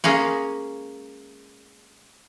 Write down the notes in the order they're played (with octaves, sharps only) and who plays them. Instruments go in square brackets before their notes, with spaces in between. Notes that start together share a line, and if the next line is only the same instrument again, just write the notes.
[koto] G#3 A#3 C#4